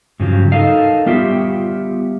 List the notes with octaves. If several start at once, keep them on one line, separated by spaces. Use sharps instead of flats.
G2 C#3 F3 F#3
D#4 A4 A#4 D#5 F5
G3 B3 F4 G4 C#5 E5